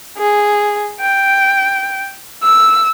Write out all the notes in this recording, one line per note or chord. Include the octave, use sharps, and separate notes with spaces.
G#4
G5
E6